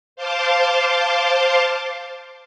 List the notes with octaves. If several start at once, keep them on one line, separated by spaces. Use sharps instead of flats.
C5 F5 A5 C6 D6